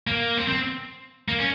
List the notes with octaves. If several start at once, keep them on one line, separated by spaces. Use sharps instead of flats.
A#3
C4
C4
A#3
C#4